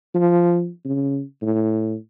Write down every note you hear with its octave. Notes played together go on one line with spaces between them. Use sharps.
F3
C#3
A2